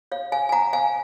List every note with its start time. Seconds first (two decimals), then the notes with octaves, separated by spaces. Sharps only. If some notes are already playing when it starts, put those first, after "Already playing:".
0.12 C#5 F5
0.32 F5 G#5
0.49 G#5
0.52 F#5 A#5
0.73 F5 G#5